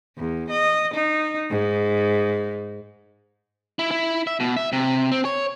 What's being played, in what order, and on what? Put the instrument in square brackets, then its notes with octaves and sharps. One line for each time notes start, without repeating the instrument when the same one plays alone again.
[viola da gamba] E2
D#5
D#4
G#2
[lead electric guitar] E4
E4
E5
B2
E5
C3
C4
C#5